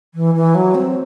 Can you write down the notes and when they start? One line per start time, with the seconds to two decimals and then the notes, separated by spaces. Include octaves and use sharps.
0.14 E3
0.34 E3
0.55 F#3
0.75 C4